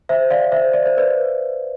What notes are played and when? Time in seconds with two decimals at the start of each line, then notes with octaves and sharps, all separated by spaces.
0.09 C5 E5
0.30 D5 F5
0.52 C5 E5
0.73 D5
0.86 C5
0.97 B4 D5